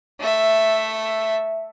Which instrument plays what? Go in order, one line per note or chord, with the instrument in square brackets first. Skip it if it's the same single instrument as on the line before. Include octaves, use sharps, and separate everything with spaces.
[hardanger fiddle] A3 E5